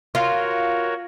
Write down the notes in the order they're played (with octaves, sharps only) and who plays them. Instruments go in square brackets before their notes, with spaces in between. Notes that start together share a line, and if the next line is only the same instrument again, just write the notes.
[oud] F4 [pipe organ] F#4 A#4 C#5